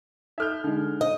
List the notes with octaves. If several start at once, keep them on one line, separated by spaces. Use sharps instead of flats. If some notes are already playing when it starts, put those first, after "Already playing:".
D#4 A4 E5 B5 F6 G6
D3 G#3 D#4
D#5